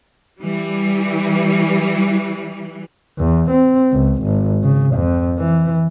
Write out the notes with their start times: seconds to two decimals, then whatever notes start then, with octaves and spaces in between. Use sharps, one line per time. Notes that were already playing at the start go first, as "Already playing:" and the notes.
0.41 E3 G3
3.19 E2
3.51 C4
3.93 C#2
4.23 G#1
4.64 C#3
4.95 F2
5.39 E3